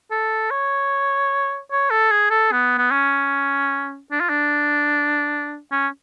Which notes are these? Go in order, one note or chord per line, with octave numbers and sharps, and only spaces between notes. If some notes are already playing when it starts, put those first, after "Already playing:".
A4
C#5
C#5
A4
G#4
A4
B3
B3
C#4
D4
F4
D4
C#4